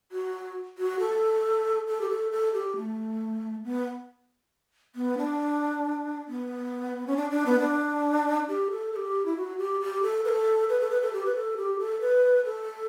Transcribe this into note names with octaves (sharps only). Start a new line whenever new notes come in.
F#4
F#4
A4
A4
G4
A4
A4
G4
A3
B3
B3
D4
B3
C#4
D4
D4
B3
D4
G4
A4
A4
G4
E4
F#4
G4
G4
A4
B4
A4
B4
A4
B4
A4
G4
B4
A4
G4
A4
B4
A4